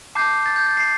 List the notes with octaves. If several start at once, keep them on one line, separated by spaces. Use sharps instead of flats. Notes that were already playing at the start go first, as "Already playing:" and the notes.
A5 D6 G6 C7
A6
G6
A6
C7